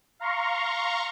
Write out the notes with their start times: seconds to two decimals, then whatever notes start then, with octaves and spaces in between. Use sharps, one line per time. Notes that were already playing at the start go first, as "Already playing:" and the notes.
0.20 F5 A#5 C6 C#6